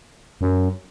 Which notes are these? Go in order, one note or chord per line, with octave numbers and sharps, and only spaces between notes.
F#2